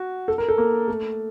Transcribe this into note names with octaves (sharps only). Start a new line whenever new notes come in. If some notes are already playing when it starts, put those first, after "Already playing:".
Already playing: F#4
A4
A#4
A4
A#3
A3